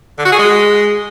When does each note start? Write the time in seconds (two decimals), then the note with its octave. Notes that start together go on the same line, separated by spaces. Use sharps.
0.18 D3
0.25 F#4
0.32 G#4
0.39 G#3